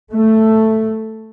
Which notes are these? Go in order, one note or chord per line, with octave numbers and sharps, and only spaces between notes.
A3